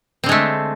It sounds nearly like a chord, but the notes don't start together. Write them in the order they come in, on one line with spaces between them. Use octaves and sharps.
C4 D3 G#3 A3